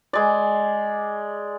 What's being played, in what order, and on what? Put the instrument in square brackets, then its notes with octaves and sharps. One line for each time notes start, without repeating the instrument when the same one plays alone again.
[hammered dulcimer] G#3 D5